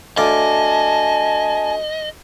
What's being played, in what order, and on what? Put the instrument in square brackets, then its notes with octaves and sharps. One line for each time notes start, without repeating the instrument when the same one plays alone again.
[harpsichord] D2 D5 F5 [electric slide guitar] D#5 [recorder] G#5 [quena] A5